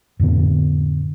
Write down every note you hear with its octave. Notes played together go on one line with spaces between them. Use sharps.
F2 A2 D3 B3